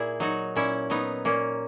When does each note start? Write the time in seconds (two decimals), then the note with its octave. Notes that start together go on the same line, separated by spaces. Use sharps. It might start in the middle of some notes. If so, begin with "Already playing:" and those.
Already playing: A#2 E4 G#4
0.20 F#3 D#4 F#4
0.56 A#2 C#4 E4
0.90 F#3 B3 D#4
1.25 A#2 A#3 C#4